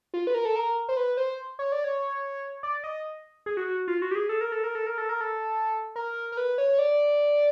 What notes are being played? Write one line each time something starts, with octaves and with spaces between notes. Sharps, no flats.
F4
B4
A#4
A4
A#4
C5
B4
C5
C#5
D5
C#5
D5
D#5
G#4
F#4
F#4
F4
F#4
G4
G#4
A4
A#4
A4
A#4
A4
A#4
A4
A#4
A4
A#4
A#4
B4
C#5
C#5
D5